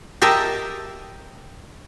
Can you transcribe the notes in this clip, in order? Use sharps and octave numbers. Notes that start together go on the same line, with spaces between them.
G4 A#4 D#5 E5 A5